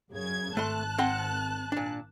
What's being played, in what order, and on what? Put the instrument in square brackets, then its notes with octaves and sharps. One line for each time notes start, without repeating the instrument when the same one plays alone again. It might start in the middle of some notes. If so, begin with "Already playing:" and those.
[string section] F#2 C#3 G#6
[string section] G#1 A5 F#6 [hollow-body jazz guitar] A3 C6
[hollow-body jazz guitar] C4 F#5 C6
A#2 D4